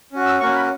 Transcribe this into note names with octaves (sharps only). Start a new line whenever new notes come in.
C#4 F#4
E6
A#3 C#4 F#4 C#6
B5